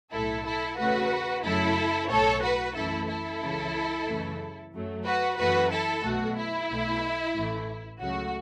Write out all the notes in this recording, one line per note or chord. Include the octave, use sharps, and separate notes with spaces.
B1 A2 A3 E4 A4
E4 A4
E2 C#3 A3 F#4 B4
F#2 C#3 F#3 A3 E4 A4
B1 A2 A3 A4 C#5
F#4 B4
F#2 E3 A3 E4 A4
E4 A4
C#2 C#3 E3
F#2 C#3 E3 A3
F#2 F#3 A3
F#4 B4
F#2 E3 A3 F#4 B4
E4 A4
B1 B2 A3 F#4
E4
B1 B2 A3
A1 A2 E3 A3
C#2 C#3 F#3 A3 F#4